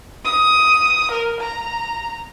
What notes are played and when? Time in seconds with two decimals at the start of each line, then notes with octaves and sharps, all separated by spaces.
0.24 D#6
1.11 A#4
1.40 A#5